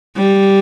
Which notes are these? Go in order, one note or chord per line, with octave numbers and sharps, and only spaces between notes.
G3